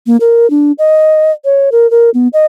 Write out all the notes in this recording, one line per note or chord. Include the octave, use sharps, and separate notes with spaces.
A#3
A#4
D4
D#5
C#5
A#4
A#4
B3
D#5